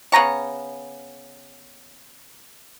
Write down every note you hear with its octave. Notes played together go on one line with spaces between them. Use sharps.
C#3 B3 A#5 C#6